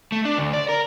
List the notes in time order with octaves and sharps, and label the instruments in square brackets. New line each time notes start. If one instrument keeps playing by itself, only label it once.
[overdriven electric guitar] A3
D4
D2
D5
A#4